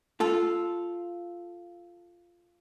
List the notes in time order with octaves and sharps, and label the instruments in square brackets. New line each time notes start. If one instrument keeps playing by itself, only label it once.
[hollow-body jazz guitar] F4 A4